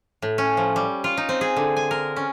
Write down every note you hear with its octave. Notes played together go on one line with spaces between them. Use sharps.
A2
C#4
F3
G3
F4
D#4
C4
G#4
D3
G#5
A#4
C#4